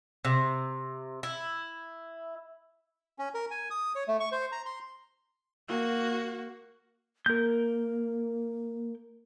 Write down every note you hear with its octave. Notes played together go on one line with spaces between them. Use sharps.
C3
E4
C#4
A#4
G#5
D#6
C#5
A3
C#6
C5
A#5
C6
A#3 F#4
A#3 A#4 G6